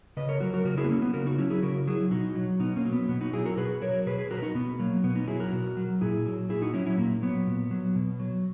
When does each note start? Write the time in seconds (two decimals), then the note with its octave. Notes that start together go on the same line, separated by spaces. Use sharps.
0.17 C#3 B4 D#5
0.29 A#4 C#5
0.40 F#3 F#4 A#4
0.54 F#4 A#4
0.65 C#3 F#4 A#4
0.77 E4 G#4
0.84 B3
0.89 F#3 A#3 C#4
1.02 B3
1.13 C#3 F#4 A#4
1.26 D#4 F#4
1.38 F#3 C#4 E4
1.50 E4 G#4
1.63 C#3 F#4 A#4
1.87 F#3 E4 G#4
2.11 B2 D#4 F#4
2.35 F#3
2.60 B2 B3 D#4
2.76 A#3 C#4
2.85 F#3
2.93 B3
3.09 B2 B3
3.21 D#4 F#4
3.33 F#3 E4 G#4
3.45 F#4 A#4
3.57 B2 G#4 B4
3.81 F#3 A#4 C#5
4.06 B2 G#4 B4
4.18 G#4 B4
4.30 F#3 F#4 A#4
4.42 D#4 F#4
4.55 B2 B3
4.80 F#3 A#3
5.03 B2 B3
5.16 B3 D#4
5.27 F#3 E4 G#4
5.40 F#4 A#4
5.53 B2
5.77 F#3
6.01 A#2 E4 G#4
6.26 F#3
6.49 A#2 E4 G#4
6.62 D#4 F#4
6.74 F#3 C#4 E4
6.86 C#4 E4
6.98 A#2 A#3
7.22 F#3 B3
7.47 A#2
7.71 F#3
7.96 B2
8.20 F#3